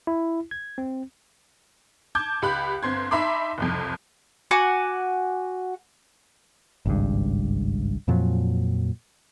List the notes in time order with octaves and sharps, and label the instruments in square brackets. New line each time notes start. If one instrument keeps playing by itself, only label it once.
[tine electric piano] E4
G#6
C4
[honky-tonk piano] A5 D6 G6 G#6
C#2 G4 B5 F#6
G1 C4 C6 G#6
D#4 E5 A5 B5 C6 D6
F#1 C2 F2
[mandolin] F#4 F#5 G#5 D6
[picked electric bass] G#1 C#2 G2
F2 A#2 F3 F#3